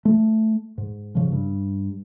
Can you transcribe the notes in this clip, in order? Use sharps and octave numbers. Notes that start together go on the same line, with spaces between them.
A3
G#2
G#2 C#3 F3
G2